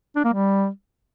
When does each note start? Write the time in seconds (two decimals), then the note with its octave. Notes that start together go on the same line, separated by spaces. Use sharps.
0.16 D4
0.25 A#3
0.33 G3